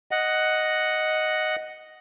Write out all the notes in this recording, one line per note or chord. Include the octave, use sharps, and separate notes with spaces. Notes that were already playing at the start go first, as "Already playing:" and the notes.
D#5 F#5